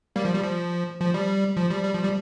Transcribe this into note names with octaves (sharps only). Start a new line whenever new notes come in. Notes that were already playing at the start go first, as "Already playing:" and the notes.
G3 A#3
F3
G3
F3
F3
G3
F3
G3
G3
F3
G3